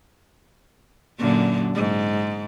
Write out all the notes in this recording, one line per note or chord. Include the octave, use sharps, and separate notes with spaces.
F#2 A#2 D3
G#2